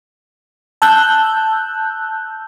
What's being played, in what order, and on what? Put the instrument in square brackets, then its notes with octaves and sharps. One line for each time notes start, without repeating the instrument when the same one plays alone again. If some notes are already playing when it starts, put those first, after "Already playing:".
[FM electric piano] A5 E6 F#6 G6